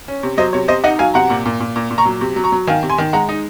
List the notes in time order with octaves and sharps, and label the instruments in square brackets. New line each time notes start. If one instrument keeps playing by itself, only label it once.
[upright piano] C#4
C3
F#3 C5 D#5
C3 C#5
C3 C5 D#5
D#4 D#5 F#5
F#3 F5 G#5
C3 F#5 A#5
A#2
A#2
A#2
A#2
A#2
A#5 C#6
F#3
C3
F#3
A#5 C#6
F#3
D#3 F5 G#5
C3
G#5 C6
D#3
G#3 F#5 A#5
D#4